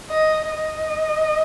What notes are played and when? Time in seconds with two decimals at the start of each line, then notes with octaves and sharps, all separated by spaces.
0.10 D#5
0.51 D#5